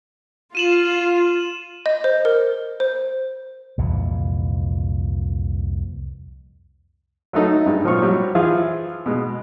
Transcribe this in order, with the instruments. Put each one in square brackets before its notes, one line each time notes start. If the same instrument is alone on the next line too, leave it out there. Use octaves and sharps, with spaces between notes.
[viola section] F4 [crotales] D#7 E7 F#7
[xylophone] D#5
C5
A#4
C5
[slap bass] C2 F2 A#2 E3
[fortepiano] F#3 A3 D#4 A4
G2 G#3
A#2 F3 F#3 C4 C#6 F6
F#3 G3
E3 F3 F4 G#4
B2 G#3